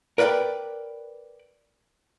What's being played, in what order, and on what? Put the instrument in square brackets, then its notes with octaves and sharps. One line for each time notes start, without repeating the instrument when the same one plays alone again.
[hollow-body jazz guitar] A#4 B4 D5 F5 G5 B5